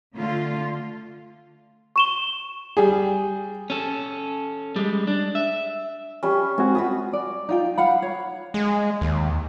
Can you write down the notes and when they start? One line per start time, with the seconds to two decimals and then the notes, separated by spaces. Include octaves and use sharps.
0.16 D3 A3 F4
1.96 C#6 E7 G7
2.77 G3 G#4
3.70 C#4 A4
4.76 G3 G#3
5.07 D4
5.35 E5
6.23 G3 C#4
6.58 G#3 C4 F#4 G#5
6.75 F4 F#4 B5 D#6
7.13 D5
7.49 D#4 F4 G5
7.78 F5 F#5 B5
8.02 C#5
8.54 G#3
9.01 D#2